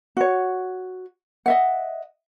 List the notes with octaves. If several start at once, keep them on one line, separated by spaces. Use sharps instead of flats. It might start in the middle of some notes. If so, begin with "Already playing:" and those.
F#4 C#5
D#5 E5 F#5